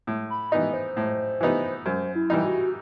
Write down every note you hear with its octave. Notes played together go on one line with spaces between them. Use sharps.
A2
B5
E3 B3 D#4 D#5
C5
A2
E3 B3 D#4
F#2 C5
E4
E3 G3 D#4
F#4